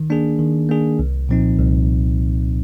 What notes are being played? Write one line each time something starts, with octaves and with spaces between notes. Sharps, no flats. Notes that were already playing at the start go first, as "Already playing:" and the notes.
Already playing: D#3
A#3 D4 G#4
D#3
A#3 D4 G#4
C2
A#2 F3 C4 D#4
C2